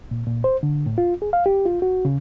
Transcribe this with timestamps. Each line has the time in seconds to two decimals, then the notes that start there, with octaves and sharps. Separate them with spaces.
0.11 A#2
0.27 A#2
0.44 C5
0.63 D3
0.86 A2
0.98 F4
1.22 G#4
1.33 F5
1.46 G4
1.65 F4
1.82 F#4
2.05 C#3